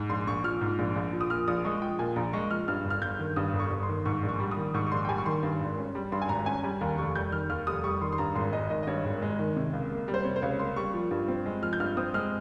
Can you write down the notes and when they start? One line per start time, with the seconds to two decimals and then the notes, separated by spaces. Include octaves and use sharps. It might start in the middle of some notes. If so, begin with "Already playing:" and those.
Already playing: G#2
0.10 A#1 C6
0.27 A#1 C#6
0.44 F3 F6
0.61 G#2
0.79 A#1
0.96 A#1
1.13 F3
1.21 D#6
1.30 A#2 F6
1.48 A#1 D#6
1.65 G#3 C#6
1.82 F3 G5
1.99 A#2 G#5
2.16 A#1 A#5
2.33 G#3 C#6
2.51 F3 F6
2.68 G2 F6
2.85 G1
2.90 F6
3.02 G1 G6
3.19 D#3
3.36 G2 D#6
3.53 G1
3.59 C#6
3.71 G1
3.83 C6
3.89 D#3
4.05 G#2 C#6
4.23 A#1
4.29 C#6
4.40 G3
4.51 D#6
4.57 D#3
4.74 G#2 C#6
4.87 C#6
4.92 A#1 C6
5.05 G5
5.09 G3 G#5
5.18 C#6
5.26 D#3 C6
5.43 G2
5.61 G#1
5.77 C#4
5.95 G3
6.12 G2 C6
6.22 G#5
6.29 G#1 A#5
6.39 A#5
6.46 C#4 G#5
6.63 G3 G#5
6.81 D#2 A#5
6.98 F1 C#6
7.15 G3 G6
7.32 D#3 F6
7.49 D#2 F6
7.67 F1 D#6
7.84 G3 C#6
8.01 D#3 C6
8.12 C6
8.18 G2 A#5
8.35 G#1 C6
8.53 G#3 D#5
8.70 D#3 D#5
8.83 D#5
8.87 G2 C#5
9.05 G#1
9.22 G#3
9.39 D#3
9.56 C3
9.73 C#2
9.91 A#3
10.08 G3
10.14 C5
10.25 C3 C#5
10.36 C5
10.42 C#2 C#5
10.59 A#3 C6
10.76 G3 C#6
10.94 F3
11.11 G2
11.28 C4
11.46 G#3
11.62 F3 F6
11.73 G6
11.80 G2 F6
11.97 C4 D#6
12.14 G#3 F6